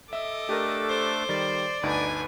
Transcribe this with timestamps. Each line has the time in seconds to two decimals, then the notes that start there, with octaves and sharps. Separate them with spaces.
0.13 A4 D#5 E5 D6 E6
0.49 A3 D4 G4 A#4
0.89 C5
1.29 D#3 G3 D5
1.83 G1 D2 D4 D#4 B4 G#5